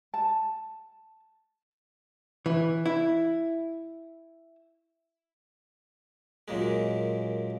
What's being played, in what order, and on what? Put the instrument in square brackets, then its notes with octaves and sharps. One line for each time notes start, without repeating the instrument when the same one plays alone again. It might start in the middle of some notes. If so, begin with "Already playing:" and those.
[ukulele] A5
[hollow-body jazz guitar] E3
E4
[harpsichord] F#2 A#2 G#3